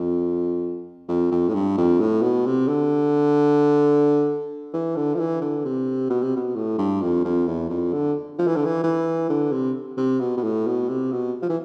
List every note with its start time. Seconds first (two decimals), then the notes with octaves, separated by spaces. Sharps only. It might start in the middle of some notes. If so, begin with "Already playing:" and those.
Already playing: F2
1.08 F2
1.32 F2
1.49 A2
1.54 G2
1.77 F2
2.00 A2
2.22 B2
2.46 C3
2.68 D3
4.73 E3
4.96 D3
5.15 F3
5.19 E3
5.41 D3
5.65 C3
6.09 B2
6.22 C3
6.36 B2
6.55 A2
6.78 G2
7.01 F2
7.24 F2
7.47 E2
7.69 F2
7.92 D3
8.39 F3
8.47 E3
8.56 D3
8.65 E3
8.83 E3
9.29 D3
9.52 C3
9.97 C3
10.20 B2
10.37 B2
10.43 A2
10.66 B2
10.89 C3
11.12 B2
11.42 F3
11.49 E3